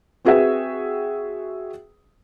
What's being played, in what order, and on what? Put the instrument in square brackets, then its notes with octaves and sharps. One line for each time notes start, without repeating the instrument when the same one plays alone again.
[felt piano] C4 F#4 G#4 B4 E5 G5